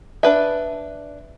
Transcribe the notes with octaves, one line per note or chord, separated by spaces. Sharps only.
D4 B4 E5